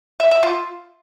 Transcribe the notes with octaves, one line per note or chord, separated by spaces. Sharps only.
E5
E5
F4